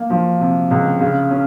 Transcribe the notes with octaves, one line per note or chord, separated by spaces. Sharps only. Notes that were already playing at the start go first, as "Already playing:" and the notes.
Already playing: A#3
F3
C3
C#2
C#3
C#4